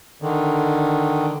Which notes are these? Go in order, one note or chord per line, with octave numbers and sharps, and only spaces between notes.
D3 D#3